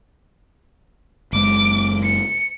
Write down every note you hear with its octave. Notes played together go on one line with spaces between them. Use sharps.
F#1 G#3 D6
C#7